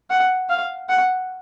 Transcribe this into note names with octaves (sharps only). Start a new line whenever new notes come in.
F#5
F5
F#5